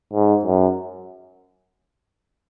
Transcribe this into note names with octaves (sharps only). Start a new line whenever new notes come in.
G#2
F#2